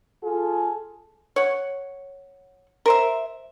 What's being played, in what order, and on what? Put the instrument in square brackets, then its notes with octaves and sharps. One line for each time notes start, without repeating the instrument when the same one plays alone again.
[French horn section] F4 G#4 A4
[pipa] C#5 F#5
A#4 C5 E5